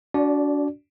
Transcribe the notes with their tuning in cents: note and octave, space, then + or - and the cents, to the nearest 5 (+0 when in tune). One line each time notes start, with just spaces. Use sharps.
D4 -30 F#4 +0 D5 +0